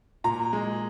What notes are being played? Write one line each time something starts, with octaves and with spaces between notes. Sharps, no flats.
A#2 A#5
G#3